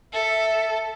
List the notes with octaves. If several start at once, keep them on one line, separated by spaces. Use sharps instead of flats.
A4 E5